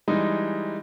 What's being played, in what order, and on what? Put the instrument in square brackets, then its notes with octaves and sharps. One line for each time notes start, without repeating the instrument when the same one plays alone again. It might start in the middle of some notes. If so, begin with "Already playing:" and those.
[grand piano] E3 G3 G#3 D#4